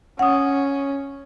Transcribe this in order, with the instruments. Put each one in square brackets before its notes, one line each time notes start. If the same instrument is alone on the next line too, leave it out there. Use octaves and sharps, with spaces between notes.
[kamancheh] C#4 [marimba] F#5 D#6